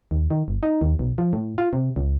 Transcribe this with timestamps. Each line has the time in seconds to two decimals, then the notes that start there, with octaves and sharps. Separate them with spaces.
0.11 D#2
0.30 D#3
0.48 G1
0.63 D#4
0.81 D#2
0.99 B1
1.18 F3
1.33 A2
1.58 F4
1.73 C3
1.96 C#2